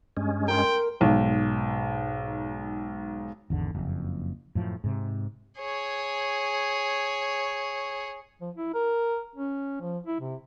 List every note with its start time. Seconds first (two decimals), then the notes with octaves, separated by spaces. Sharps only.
0.17 G2 G#3 C#4
0.48 A#4 G5 C6
1.01 B1 G#2
3.50 G#1 E2 D3
3.75 F#1 F2
4.55 F#2 A2 F3
4.84 G#2 C3
5.60 G#4 C#5
8.41 F3
8.55 E4
8.74 A#4
9.35 C#4
9.80 F3
10.07 E4
10.20 C3